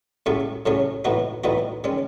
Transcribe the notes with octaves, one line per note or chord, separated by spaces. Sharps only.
A2 F#3 A3 C#4 G#4
A2 F#3 A3 C#4 G#4
A2 E3 B3 D#4 F#4
A2 E3 B3 D#4 F#4
D#3 G#3 C#4